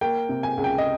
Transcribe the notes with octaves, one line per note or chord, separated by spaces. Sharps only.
A#3 G5
C3
G#5
C#2
G5
D#5